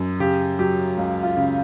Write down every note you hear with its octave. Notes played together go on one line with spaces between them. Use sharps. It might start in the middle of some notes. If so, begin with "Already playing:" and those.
Already playing: F#2
C#3 G4
F#3 G4
C#2
F4
C#3